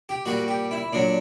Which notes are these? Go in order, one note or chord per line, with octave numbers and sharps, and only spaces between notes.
G4
A#2 G3 F#4
G4
E4
A#2 F#3 D4